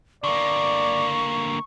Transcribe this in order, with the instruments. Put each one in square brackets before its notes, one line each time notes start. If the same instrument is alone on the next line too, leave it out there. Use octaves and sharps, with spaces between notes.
[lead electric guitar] D3 A#3 [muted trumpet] D5 [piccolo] C#6